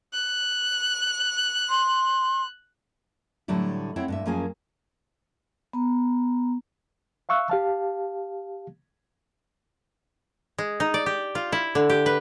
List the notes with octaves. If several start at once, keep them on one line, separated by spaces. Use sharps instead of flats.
F#6
C6
A2 D3 F#3 G3 E4
C4 E4 C#5 E5 F#5 G5
G2 A#2 E5
F#2 F3 A#3 C#4 G#4 G#5
B3 A#5
E5 F5 C#6 E6 F#6
G4 F5 A5
G#3
D#4
D5
G4
F4
E4
D3
G4
B4